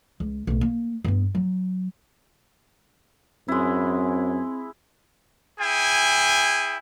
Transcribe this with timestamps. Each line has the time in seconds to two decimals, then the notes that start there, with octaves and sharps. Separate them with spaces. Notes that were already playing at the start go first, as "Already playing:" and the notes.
0.20 C#2
0.47 B1 A2
0.61 A#3
1.04 G2 B3
1.35 F#3
3.48 F#2 G#3 C4 E4
5.60 E4 G#4 G5 G#5